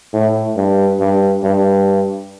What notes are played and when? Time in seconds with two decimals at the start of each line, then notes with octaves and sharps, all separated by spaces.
0.13 A2
0.56 G2
1.00 G2
1.43 G2